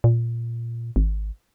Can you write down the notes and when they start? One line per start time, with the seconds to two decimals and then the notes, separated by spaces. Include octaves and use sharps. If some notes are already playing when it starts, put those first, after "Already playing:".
0.04 A#2
0.96 G#1